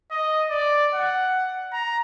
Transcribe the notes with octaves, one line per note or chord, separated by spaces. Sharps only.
D#5
D5
F#5
A#5